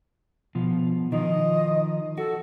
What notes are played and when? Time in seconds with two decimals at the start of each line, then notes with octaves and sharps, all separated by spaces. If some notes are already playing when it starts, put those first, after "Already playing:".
0.55 B2 F3
1.12 D#3 F3 D#5
2.18 F#4 A4